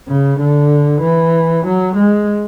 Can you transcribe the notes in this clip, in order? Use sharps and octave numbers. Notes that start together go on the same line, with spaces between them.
C#3
D3
E3
F#3
G#3